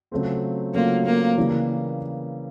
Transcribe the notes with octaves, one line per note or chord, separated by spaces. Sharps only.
C#3 F#3 A3 C4 F4
C#3 F#3 A3 A#3 C4 F4
A#3
C#3 E3 G3 A#3